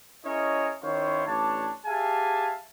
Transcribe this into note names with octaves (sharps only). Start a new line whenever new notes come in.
C#4 E4 G#4 A#4 C#5 D#5
D#3 C#4 E4 F4 C5 C#5
A1 D4 C#5 A5
G4 G#4 E5 F5 G#5 A5